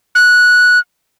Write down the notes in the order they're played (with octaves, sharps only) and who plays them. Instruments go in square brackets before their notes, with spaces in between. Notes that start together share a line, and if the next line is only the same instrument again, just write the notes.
[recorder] F#6